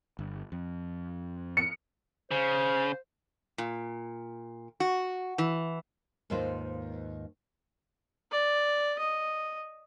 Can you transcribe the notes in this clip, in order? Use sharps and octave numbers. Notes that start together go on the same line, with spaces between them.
G1
F2
C#7
C#3 C5
A#2
F#4
E3
D#2 G#2 D#3 F4 B4 C5
D5
D#5